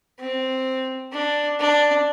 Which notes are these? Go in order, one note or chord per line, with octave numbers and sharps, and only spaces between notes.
C4
D4
D4